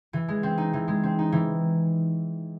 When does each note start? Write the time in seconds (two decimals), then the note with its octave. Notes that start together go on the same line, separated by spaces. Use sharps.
0.13 E3
0.28 G#3
0.43 C4
0.58 D#4
0.73 E3
0.88 G#3
1.03 C4
1.19 D#4
1.32 E3